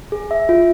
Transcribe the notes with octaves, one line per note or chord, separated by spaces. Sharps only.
G#4
E5
F4